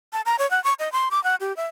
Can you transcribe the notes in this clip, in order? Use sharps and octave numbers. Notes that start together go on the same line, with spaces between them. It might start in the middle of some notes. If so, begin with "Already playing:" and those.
A5
A#5
C#5
F#5
C#6
D#5
C6
D6
F#5
G4
E5